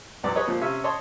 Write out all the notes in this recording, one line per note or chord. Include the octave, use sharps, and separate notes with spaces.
B1 E2 F#3 B3 D5
G#4 B4 C#5 D#5
A#2 F3
C3 C#4 E5
C#5 D#5 A5 C6 C#6